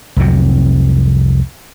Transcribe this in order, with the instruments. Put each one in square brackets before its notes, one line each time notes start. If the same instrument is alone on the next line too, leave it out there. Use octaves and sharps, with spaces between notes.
[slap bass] C2 F2 C3 F#3